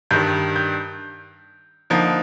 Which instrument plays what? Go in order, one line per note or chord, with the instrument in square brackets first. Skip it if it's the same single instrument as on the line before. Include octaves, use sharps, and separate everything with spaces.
[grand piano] G2 D#3 G3 G6
G6
D3 F3 A#3 D#4